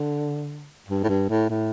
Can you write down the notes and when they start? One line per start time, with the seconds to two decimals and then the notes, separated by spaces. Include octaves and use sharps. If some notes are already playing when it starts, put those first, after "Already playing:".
Already playing: D3
0.88 G2
1.03 A2
1.08 G2
1.29 A2
1.50 A2